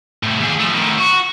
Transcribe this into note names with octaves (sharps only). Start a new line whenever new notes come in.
A2 C3
D#2 G#4
F3 A3
A2 D#3
F#4